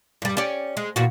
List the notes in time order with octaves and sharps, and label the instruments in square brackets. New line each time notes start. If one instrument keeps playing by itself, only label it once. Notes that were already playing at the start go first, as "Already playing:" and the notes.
[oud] G2 G3
C#4 G4 D5
G#3
E2 A#2 F#4